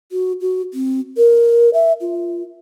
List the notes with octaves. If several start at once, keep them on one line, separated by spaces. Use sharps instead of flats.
F#4
F#4
C4
A#4
E5
F4